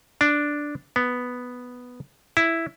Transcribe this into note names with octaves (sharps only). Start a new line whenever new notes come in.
D4
B3
E4